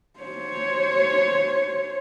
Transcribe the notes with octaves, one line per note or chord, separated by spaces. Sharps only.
C5 C#5